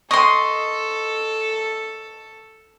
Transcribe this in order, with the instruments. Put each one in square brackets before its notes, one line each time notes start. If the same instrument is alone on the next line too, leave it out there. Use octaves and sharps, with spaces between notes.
[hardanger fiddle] A4 [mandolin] D#5 C6 [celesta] C#6